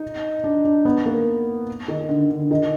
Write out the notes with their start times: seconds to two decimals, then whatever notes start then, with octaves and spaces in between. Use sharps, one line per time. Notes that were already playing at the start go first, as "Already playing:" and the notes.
Already playing: D#4
0.44 D4
0.65 D4
0.85 B3
1.06 A#3
1.88 D#3
2.09 D3
2.30 D3
2.51 D#3